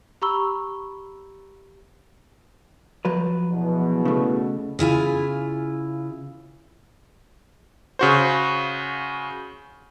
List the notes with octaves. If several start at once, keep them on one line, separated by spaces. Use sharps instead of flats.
G4 A#5 B5 C#6 E6 G7
F3 F#3 B4
E2 B2
C#3 A3
C#3 E4 F4 G#5
C#3 F#4 C5